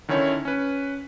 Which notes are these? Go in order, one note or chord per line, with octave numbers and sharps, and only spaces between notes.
D3 D#3 C#4 E4 C#5
C#4 B4